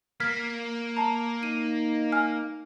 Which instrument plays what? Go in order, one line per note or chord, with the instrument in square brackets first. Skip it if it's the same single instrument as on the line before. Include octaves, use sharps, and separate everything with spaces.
[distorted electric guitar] A#3 [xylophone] F6 G#6 B6
[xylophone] A5 A#5
[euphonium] D#4 [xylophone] D#7
[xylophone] G#5 F6